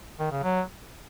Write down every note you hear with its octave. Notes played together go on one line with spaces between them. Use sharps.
D#3
C#3
F#3